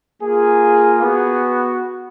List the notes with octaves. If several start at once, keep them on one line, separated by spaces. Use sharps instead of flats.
A#3 F4 G#4
B3 F#4 G#4